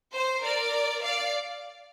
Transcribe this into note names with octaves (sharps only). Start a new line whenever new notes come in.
C5
A#4 D5
D5 F5